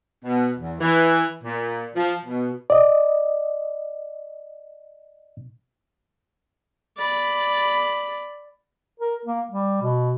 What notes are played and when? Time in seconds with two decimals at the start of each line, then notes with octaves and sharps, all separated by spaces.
0.24 B2
0.59 E2
0.81 E3
1.44 A#2
1.95 F3
2.26 B2
2.70 D5 D#5
6.98 D5 B5
9.00 A#4
9.25 A#3
9.51 G3
9.82 B2